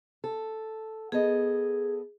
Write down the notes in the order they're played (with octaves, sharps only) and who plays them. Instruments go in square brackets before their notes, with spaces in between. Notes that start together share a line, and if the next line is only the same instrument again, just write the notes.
[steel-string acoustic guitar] A4
[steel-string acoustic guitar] B3 A4 D#5 [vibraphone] G#4